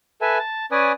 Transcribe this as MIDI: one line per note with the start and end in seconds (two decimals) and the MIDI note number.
0.21 0.38 69
0.21 0.38 71
0.21 0.38 76
0.21 0.38 80
0.39 0.66 81
0.71 0.92 61
0.71 0.92 71
0.71 0.92 74
0.71 0.92 80
0.71 0.92 87